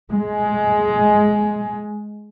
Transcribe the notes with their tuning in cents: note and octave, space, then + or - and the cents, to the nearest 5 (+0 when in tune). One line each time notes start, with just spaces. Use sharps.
G#3 +10